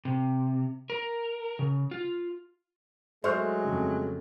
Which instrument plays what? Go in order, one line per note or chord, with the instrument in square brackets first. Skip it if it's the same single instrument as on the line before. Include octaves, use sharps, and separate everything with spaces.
[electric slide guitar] C3
A#4
C#3
F4
[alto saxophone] F#3 [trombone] G#3 [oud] A3 [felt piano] C5 C#6 F6
[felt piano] F2 C#3